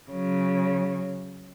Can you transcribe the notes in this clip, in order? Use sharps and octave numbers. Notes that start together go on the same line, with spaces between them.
C#3 F#3